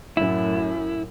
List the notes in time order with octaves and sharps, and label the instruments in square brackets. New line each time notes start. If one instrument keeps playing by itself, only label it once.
[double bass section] F#2 A2 [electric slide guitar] E4